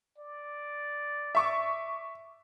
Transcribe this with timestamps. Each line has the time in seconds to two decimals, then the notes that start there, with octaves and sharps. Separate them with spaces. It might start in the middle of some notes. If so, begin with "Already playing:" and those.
0.18 D5
1.35 E5 C#6 D6